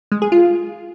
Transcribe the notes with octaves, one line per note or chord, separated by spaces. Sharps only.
G#3
G#4
F4